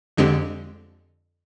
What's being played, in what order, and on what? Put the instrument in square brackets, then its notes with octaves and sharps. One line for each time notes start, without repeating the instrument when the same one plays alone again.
[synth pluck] F2 D3 G#3 C4 G4